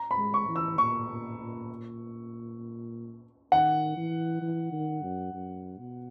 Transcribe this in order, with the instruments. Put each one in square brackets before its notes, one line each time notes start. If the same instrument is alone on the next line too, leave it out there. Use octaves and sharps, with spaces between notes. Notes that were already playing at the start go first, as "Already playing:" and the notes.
Already playing: [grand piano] A#5
B5
[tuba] G#3
[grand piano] C#6
[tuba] E3
[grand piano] E6
[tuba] A#2 [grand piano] C#6
[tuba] A#2
A#2
[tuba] D#3 [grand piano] F#5
[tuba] E3
E3
D#3
F#2
F#2
B2